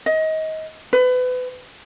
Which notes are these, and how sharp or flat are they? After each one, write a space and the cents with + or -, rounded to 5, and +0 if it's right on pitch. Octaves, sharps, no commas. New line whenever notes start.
D#5 +25
B4 +30